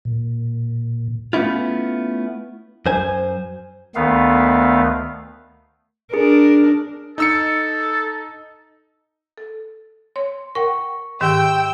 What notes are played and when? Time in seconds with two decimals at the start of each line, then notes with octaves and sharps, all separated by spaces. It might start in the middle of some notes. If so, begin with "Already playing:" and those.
0.05 A#2
1.33 A3 B3 C#4 E4 F4
2.86 F#2 C5 G#5
3.95 D2 D#3 A3 B3 F5
6.14 D4 G#4 A#4
7.18 D#4 A4 E6 C#7
9.38 A4
10.16 C#5 C6
10.55 A#4 F#5 G5 C#6
11.21 G#2 D#3 G4 G5 E6